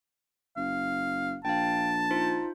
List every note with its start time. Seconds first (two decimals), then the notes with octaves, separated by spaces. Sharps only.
0.57 F#1 F5
1.45 A#1 F5 G5 A5
2.10 D#4 F4 C5